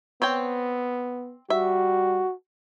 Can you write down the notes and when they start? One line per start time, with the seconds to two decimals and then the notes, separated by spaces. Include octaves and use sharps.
0.22 B3 C4 C#5 G5
1.50 G3 F#4 E5